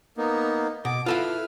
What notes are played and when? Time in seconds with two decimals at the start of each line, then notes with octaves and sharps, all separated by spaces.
0.17 A#3 B3 D#4
0.85 B2 D6
1.06 E4 F4 A4 B4 F5 F6